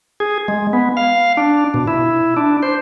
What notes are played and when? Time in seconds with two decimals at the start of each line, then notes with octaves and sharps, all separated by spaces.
0.20 G#4
0.48 G#3
0.73 B3
0.97 F5
1.37 D4
1.74 B2
1.87 E4
2.37 D4
2.63 C5